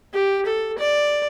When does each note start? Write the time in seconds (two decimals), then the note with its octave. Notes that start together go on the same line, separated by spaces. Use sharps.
0.14 G4
0.46 A4
0.79 D5